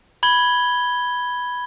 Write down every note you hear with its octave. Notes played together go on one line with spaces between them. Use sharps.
B5 G#6 G7